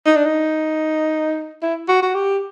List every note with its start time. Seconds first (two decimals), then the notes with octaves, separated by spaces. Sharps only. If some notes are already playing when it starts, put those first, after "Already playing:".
0.06 D#4
0.16 D4
0.26 D#4
1.62 E4
1.88 F#4
2.03 F#4
2.15 G4